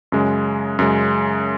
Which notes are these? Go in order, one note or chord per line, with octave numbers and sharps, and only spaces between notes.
F#2 C#3 G#3
F#2 C#3 G#3